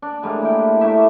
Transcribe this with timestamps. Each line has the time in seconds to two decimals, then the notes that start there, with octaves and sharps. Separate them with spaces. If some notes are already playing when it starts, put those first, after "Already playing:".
0.02 D4
0.23 A2 G3 G#3 A#3
0.42 E4 G5
0.81 A3 E4 G4 E5